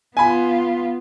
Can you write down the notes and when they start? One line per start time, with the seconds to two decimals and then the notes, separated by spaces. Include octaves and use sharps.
0.17 B3 F4 G#5 B5